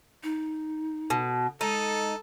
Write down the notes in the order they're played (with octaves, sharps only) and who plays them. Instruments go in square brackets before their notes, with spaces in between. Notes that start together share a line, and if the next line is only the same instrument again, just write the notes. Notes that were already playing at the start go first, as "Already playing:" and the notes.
[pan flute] D#4
[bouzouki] B2
[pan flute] G#3 [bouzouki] D#4 [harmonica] A4